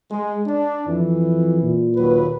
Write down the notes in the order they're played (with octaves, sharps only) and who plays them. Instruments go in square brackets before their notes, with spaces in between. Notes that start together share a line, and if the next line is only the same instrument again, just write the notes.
[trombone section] G#3
D4
[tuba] F2 [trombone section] E3
[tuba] A#2
[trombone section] D#2 F#3 B4